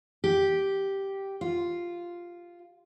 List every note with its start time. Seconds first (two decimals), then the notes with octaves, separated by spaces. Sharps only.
0.24 G4
1.41 F4